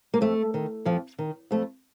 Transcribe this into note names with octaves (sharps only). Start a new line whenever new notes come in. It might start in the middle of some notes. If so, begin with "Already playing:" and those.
A#3
F2 A3
D#3
F2 F3
D#3
F2 A3